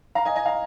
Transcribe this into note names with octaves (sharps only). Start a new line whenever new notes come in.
F5 A#5
D#5 G#5
D#5 G#5
F5 A#5